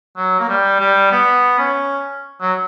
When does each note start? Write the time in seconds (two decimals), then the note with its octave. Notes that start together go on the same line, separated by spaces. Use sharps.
0.17 F#3
0.40 A#3
0.49 G3
0.80 G3
1.11 B3
1.58 C#4
2.41 F#3